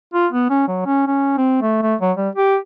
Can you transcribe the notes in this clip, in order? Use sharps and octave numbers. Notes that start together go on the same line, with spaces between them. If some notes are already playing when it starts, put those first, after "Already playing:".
F4
B3
C#4
F#3
C#4
C#4
C4
A3
A3
F#3
G3
G4